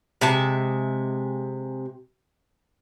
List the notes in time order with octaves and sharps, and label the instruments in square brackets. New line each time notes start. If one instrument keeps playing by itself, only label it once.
[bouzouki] C3 G#3 E5 A5